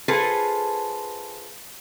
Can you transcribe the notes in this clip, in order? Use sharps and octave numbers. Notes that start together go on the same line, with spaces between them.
F4 G#4 A4 B4 C5